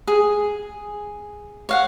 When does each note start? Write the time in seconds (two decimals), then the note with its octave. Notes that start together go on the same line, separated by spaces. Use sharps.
0.07 G#4
1.69 C#5 F5 F#5